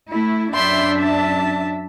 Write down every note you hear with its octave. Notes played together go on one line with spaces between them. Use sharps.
A3 E4
F#2 D4 E5 G5 B5 C6
A5